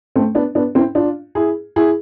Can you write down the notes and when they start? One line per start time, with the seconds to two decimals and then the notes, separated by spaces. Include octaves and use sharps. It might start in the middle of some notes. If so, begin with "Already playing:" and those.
0.16 A3 C4
0.35 B3 D4
0.55 B3 D4
0.75 C4 E4
0.95 D4 F4
1.35 E4 G#4
1.76 E4 G#4